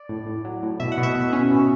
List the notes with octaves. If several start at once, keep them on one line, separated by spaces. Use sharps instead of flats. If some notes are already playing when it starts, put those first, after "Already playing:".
Already playing: D5
A2
A2
F#3
A2
B2 E5
F#5
B2
E5
B2
C#4
B2